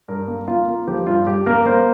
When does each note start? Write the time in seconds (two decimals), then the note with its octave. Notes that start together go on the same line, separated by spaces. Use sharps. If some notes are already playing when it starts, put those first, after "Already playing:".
0.08 G2 A#4
0.28 A#3
0.48 A#3 F4
0.68 A#3
0.87 F3 G4
1.07 G2 F4
1.26 G2 G4
1.46 A#3 A#4
1.66 A#3 C5